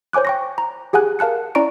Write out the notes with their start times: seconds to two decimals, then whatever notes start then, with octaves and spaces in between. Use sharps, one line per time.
0.13 C5 C#5 G#5 D6 F#6
0.25 G5 C#6 A#6
0.58 A#5
0.93 G4 G#4 F#5 G#5 F#6
1.19 A#4 F5 A5 F#6 C#7
1.55 C#4 E4 D5 A#5 C#6 D7